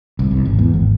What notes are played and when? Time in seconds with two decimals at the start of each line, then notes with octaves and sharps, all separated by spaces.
0.19 C2
0.31 C2
0.45 G#1
0.59 E2
0.74 G#1